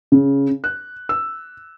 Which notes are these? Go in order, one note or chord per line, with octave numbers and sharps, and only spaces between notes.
C#3
F#6
E6